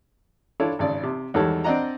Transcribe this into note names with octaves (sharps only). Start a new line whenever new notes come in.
D4 E4 F4 A4 C#5
G#1 C#3 D5
C3
E2 D#3 G3 G#3 A4 C#5
C4 D4 D5 D#5 F#5 A#5